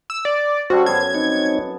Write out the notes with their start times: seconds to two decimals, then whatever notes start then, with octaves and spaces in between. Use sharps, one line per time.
0.10 E6
0.25 D5
0.70 C#3 G3 F#4 A4 C5
0.86 F#2 B3 A5 G#6
1.14 C4 D#4 C#5